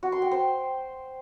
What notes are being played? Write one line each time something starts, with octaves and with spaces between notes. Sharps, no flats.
F#4
C6
G5
C5